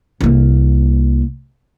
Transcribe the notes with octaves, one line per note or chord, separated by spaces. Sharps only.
C2 A#3